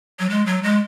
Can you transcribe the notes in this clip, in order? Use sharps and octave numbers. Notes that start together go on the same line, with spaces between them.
F#3
G#3
F#3
G#3